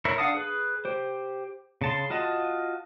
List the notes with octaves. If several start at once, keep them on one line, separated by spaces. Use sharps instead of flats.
E4 A#4 C#5 E5
D4 F5 F#5 A5 D#6
G#4 B4
G4 C5
C#3 A5 C6
F4 F#4 D#5 A5